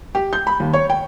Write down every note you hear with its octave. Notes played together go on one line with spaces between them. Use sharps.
G4
G6
B5
D#2
C#5
G5